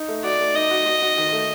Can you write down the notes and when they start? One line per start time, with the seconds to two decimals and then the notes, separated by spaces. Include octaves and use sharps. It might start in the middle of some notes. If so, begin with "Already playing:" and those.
Already playing: D#4
0.09 A3
0.24 F#4 D5
0.40 A3
0.54 D#4 D#5
0.71 F#4
0.86 F#4
1.02 F#4
1.17 D#3
1.33 A3